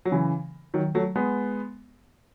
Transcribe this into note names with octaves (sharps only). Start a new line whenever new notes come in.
F#3
C#3 E3
D#3 F#3
F#3 A3
G#3 B3